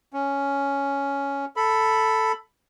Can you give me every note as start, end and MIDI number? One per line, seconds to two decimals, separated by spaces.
0.13 1.45 61
1.56 2.32 69
1.56 2.32 83